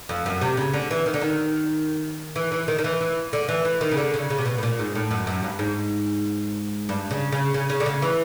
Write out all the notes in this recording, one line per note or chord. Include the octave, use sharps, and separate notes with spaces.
F2
F#2
C3
C#3
D3
E3
D#3
D3
D#3
E3
E3
D#3
D#3
E3
E3
D3
E3
E3
D#3
C#3
D3
C#3
C#3
C3
B2
A2
A#2
G#2
A2
F#2
F#2
G2
G#2
G2
C#3
C#3
C#3
C#3
D3
C#3
E3